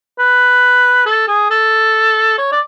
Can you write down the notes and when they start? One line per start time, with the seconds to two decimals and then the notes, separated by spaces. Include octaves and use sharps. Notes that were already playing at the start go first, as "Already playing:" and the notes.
0.19 B4
1.06 A4
1.28 G#4
1.50 A4
2.38 C#5
2.52 D5